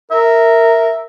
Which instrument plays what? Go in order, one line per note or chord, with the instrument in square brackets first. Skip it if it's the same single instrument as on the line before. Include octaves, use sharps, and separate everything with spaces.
[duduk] A#4 [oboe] E5